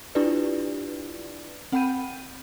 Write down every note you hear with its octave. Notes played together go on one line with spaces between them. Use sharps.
D4 E4 F4 G4 B4 D5
C4 F#5 G5 B5 G6 D#7